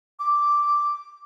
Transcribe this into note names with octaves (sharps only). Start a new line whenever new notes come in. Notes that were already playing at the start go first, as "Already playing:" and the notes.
D6